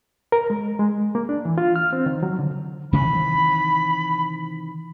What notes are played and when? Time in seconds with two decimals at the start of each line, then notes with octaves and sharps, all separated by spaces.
0.32 A#4
0.50 G#3
0.79 G#3
1.15 A#3
1.29 D4
1.45 E3
1.58 F4
1.76 F6
1.93 C4
2.06 D#3
2.23 F#3
2.39 D3
2.93 C3 D#3 E3 B5